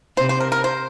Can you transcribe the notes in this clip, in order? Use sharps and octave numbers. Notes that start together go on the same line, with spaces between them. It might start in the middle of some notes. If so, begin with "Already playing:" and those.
C3 C5
C5
A#4
A#4
C5